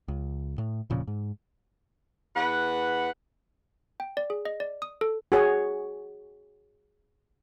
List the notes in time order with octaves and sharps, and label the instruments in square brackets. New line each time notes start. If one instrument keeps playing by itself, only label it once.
[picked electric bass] C#2
A2
E1 A#2 C#3 F3
G#2
[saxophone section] E2 B4 F#5
[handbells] G5
D5
G#4
D#5
D5
D#6
A4
[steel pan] F#4 G#4 C#5